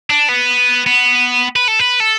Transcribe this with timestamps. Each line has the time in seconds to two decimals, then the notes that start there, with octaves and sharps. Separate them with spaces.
0.10 D4
0.29 B3
0.86 B3
1.56 B4
1.68 A4
1.80 B4
2.00 A4